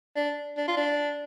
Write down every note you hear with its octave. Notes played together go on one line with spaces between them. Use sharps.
D4
D4
F4
D4